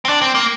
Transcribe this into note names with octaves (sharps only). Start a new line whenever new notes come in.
C4
D4
C4
A#3